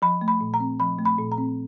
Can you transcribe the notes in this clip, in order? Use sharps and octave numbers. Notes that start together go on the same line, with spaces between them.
F3 B5
A3
B5
A#2
A#5
C4
F3 B5
A3
B5
A#2
A#5
C4